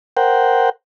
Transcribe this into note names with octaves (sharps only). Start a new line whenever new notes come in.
A#4 C5 F#5 G5